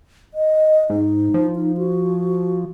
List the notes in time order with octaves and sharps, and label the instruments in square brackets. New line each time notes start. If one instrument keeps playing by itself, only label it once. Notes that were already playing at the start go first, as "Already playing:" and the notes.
[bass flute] D#5
[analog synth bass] G#2 [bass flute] D#4
[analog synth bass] F3
[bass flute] D#4
F#4